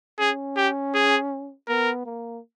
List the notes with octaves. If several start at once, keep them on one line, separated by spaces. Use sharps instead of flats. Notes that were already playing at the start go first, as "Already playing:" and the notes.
C#4 G#4
G4
G#4
B3 A#4
A#3